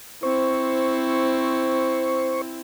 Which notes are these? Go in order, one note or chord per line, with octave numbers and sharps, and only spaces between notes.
C4 E4 C5 C#6